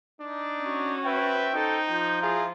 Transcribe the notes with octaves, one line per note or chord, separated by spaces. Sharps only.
D4 D#4
C#4 F#4
B4 C5 E5 G5
D#4 A4
F3 G6
E4 F4 G#4 A#5